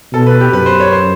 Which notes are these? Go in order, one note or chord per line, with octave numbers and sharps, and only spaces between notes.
B2 A4
B4
G4
F#2 B4
C5
C#5
C5